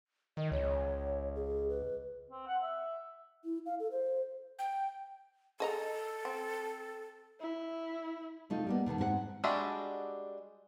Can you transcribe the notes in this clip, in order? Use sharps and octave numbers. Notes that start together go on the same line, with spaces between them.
D#3 D#5
C#2 C#5
G#4
B4
C4
F#5
E5
E4
F5
A4
C5
G5
G#4 A4 D#5 A#5
C4
E4
C3 A3 D#4 F4
G3 A#3 B3
B2 D#3 B3 A4
G#2 C4 G#4 F#5
G3 G#3 D4 F#4 E5